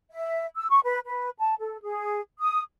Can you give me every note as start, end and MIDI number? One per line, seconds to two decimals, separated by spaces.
0.10 0.44 76
0.56 0.67 88
0.70 0.79 85
0.84 1.00 71
1.07 1.29 71
1.39 1.54 81
1.60 1.78 69
1.82 2.21 68
2.38 2.62 87